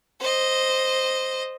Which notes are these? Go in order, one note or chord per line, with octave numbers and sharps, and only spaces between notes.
C5 D#5